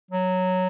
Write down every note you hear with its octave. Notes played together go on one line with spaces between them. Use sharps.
F#3